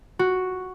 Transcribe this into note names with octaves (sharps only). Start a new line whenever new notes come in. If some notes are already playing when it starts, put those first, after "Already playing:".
F#4